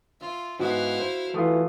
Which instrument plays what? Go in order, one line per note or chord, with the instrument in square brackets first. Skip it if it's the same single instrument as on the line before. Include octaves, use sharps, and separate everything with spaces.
[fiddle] F4 [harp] E5
[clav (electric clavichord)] G#2 B3 [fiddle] E4 F5 [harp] F#4
[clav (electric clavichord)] C5
[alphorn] E3 [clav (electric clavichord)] A3 F4 [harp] F#5 D#6